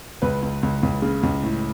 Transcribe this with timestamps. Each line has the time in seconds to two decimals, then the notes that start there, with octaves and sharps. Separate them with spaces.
0.22 C#2 B4
0.42 C#2
0.63 C#2
0.83 C#2
1.02 C#3
1.23 C#2
1.43 A2